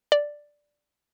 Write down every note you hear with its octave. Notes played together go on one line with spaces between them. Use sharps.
D5